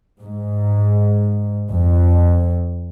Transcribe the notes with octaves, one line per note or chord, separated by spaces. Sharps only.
G#2
F2